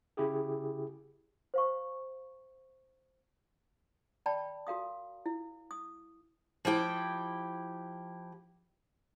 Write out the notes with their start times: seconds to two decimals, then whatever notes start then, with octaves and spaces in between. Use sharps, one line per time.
0.17 C#3 E4 G4 G#4
1.54 C5 F5 C#6
4.26 D5 G5 A5 B5
4.67 F#4 A#4 F5 D#6
5.26 E4
5.71 D#6
6.65 F3 E4 G4 G5